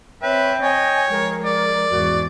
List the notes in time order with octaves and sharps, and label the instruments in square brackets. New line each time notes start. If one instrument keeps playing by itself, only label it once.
[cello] C4 E5 [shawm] B4 [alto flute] C#5 [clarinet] G5
[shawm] C#5 [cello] D#5 [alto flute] G#5
[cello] F3 G#3 [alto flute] A#4
[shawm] D5
[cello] E2 G#2 [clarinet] F#4